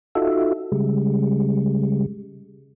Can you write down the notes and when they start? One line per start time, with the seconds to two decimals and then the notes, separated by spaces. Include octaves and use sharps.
0.15 D#4 F4 F#4 A4 E5
0.72 C#3 G3 G#3